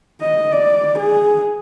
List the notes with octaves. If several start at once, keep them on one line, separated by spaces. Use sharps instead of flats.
D#5
D5
G#4